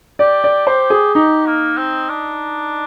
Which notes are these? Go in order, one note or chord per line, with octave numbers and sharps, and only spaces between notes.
G4 D5
D5
G4 C5
G#4
D#4 G4
A#3
C4
D4